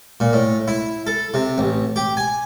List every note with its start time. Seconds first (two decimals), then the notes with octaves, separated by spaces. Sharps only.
0.20 A#2
0.33 A2
0.68 E4
1.07 A4
1.34 C3
1.58 A1
1.96 G4
2.17 G#5